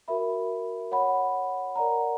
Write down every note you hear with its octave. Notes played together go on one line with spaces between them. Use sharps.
F#4 A#4 E5 B5
C#5 F#5 B5
A#4 D5 F#5 A#5